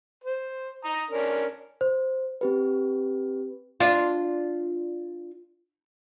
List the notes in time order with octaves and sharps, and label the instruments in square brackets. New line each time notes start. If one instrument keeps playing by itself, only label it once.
[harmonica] C5
A#5 D#6
C#4 D4 A#4
[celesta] C5
[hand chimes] C4 G4 B4
[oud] D4 F4